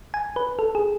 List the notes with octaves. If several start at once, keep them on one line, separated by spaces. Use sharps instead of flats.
G#5
B4
A4
G#4